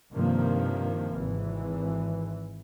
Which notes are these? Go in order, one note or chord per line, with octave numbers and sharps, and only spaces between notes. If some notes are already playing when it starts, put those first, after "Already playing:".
G2 C3 D#3 F3 A#3
G#1 E3